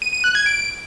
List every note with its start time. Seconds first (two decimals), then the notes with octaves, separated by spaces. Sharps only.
0.02 D#7
0.13 D#7
0.24 F#6
0.35 G#6
0.46 D7